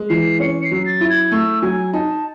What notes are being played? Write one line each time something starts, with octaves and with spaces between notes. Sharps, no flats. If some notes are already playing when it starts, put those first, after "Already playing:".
Already playing: G#3
E3 C7
C#4 C#7
C7
F#3
A6
E4
G#6
A3 E6
F#3 G#5
D#4 A5